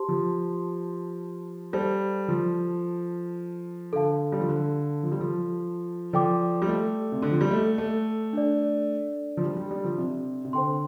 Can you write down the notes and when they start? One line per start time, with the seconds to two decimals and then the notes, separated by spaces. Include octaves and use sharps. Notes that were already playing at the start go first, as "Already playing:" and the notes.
Already playing: G4 C5 A5 C6
0.08 F3
1.73 G3 A4 C5 A5
2.28 F3
3.93 D3 A4 F5 A5
4.32 G3
4.40 F3
4.49 D3
5.03 F3
5.12 G3
5.20 F3
6.13 F3 A4 D5 G5 D6
6.62 G3
6.68 A3
7.12 C3
7.22 D3
7.31 F3
7.41 G3
7.51 A3
7.78 A3
8.33 D4 A4 D5
9.37 F3
9.44 G3
9.57 G3
9.71 G3
9.84 F3
9.98 C3
10.45 C3
10.53 D3 C5 G5 C6